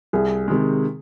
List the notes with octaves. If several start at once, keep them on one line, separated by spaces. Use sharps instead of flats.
C2 G#4
C3 D#3 G#3